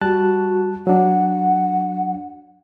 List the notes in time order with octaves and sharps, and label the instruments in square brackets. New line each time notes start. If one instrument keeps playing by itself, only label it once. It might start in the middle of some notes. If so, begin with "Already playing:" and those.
[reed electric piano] G3 A5 F#6 [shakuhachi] F#4
[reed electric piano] F#3 D4 [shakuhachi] F#5